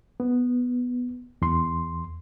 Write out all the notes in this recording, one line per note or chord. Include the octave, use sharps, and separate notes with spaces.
B3
E2 C6